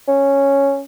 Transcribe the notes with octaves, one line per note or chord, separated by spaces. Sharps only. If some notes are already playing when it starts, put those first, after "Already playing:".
C#4